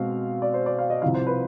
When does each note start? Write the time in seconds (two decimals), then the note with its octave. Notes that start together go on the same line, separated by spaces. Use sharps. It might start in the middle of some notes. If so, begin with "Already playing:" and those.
Already playing: B2 G#3 C4 F5
0.42 D5
0.54 C5
0.66 D5
0.79 F5
0.90 D#5
1.02 C2 C3 F3 F5
1.14 C5
1.27 B4